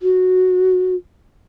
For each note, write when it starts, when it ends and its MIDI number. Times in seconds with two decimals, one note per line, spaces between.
0.02 0.95 66